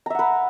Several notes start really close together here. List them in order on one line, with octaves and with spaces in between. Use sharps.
A#5 E5 F#5 B4